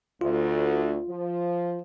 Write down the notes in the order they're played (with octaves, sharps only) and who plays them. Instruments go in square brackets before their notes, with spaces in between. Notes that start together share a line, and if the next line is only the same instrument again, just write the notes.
[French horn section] D2 [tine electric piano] F4
[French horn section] F3